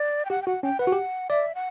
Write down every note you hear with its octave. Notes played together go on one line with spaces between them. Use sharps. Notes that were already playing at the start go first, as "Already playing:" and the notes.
Already playing: D5
G5
G4 F#5
G5
F#4 F#5
C#4 G5
B4 F#5
F#4
G4
D5 E5
F#5